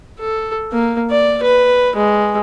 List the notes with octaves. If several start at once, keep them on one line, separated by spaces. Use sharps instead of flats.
A4
A#3
D5
B4
G#3